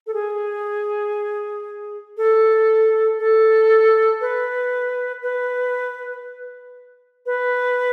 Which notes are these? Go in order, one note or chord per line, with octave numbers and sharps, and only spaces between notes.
A4
G#4
A4
A4
B4
B4
B4